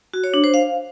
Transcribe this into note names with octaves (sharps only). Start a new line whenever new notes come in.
F#4
C#5
D4
C5
F5